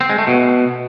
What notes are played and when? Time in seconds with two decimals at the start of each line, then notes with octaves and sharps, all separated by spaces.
0.01 C4
0.10 G#3
0.18 A3
0.27 B2